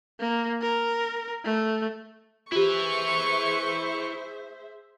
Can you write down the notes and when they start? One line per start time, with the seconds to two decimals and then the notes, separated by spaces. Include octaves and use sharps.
0.20 A#3
0.62 A#4
1.45 A3
2.52 E4 F4 G4 G#4 B4 C5 E5 C#6